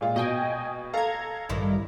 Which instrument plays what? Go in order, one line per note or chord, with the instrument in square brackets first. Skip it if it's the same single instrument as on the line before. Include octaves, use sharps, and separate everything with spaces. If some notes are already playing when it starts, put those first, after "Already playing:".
[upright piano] A#2 G#3 F4
[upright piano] B2 [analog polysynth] D#5 G5 G#5
[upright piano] A4 F5 [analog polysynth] A#5 G#6
[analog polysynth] A1 [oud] G2 D#3 E4